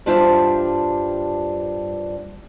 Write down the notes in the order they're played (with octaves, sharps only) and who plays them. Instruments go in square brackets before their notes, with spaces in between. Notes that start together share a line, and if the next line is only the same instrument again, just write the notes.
[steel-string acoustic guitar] G2 G3 D4 F4 C5 E5